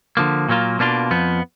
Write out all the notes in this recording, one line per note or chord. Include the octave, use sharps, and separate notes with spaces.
D3 F3 A#3
A#2 F#3 A#3 F4
B2 A#3 D4 F4
F2 F3 B3